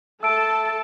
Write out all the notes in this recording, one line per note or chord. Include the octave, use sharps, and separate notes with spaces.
A3 A4 A5 E6 D7